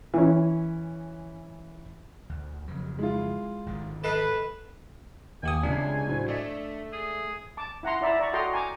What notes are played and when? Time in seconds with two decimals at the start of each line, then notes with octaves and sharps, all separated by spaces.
0.14 E3 C#4
2.29 D2
2.68 F2 C#3 F#3
2.99 G#3 E4 F4
3.66 G#1 D3 D#3
4.04 A4 B4 D#5 C7 E7
5.43 D#2 G4 G#5 D#6
5.63 C#2 C3 G#3 D4 F4
6.07 A2 F#3 C5
6.28 A3 D5 D#5
6.93 G#4
7.57 A5 D6
7.83 E4 F#5 A#5 C6
8.01 E4 D5 E5 A#5
8.19 D5 A#5 C#6
8.33 F#4 A4 D#5 G5 A#5 C6
8.53 G#5 A#5 D6